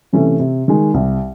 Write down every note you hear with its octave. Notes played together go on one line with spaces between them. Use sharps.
C3 E3 A3 C#4
C3
D#3 G#3
C2